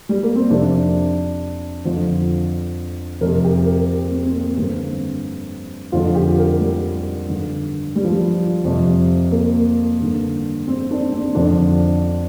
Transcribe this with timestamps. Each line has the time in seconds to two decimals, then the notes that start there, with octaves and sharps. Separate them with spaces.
0.09 G3
0.23 A#3
0.36 C4
0.50 F2 C3 D4
1.85 F2 D3 F4
3.21 F2 C3 A#4
3.44 G4
3.66 A#4
4.11 C4
4.26 C4
4.35 A#3
4.57 G2 D3 C4
5.92 F2 D3 F4
6.15 G4
6.38 A#4
6.60 G3
7.29 G2 D3
7.96 G3
8.04 F3
8.11 G3
8.64 F2 C3
9.31 A#3
10.00 G2 D3
10.68 C4
10.91 D4
11.13 C4
11.35 F2 D3 D4